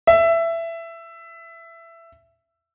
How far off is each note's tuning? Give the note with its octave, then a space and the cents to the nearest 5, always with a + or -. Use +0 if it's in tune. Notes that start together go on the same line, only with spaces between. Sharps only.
E5 +15